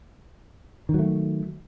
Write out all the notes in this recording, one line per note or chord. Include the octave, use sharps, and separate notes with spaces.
D#3 F#3 A3